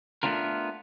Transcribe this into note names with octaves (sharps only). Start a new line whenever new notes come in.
A3 B3 C4 D4 F4 A#4